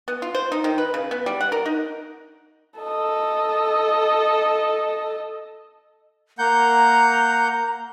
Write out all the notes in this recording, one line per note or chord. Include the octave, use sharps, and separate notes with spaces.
B3
F4
C5
D#4
D#3
B4
C#3
B3
G3
F#5
A#4
D#4
A4 D#5
A#3 F#5 A#5 G6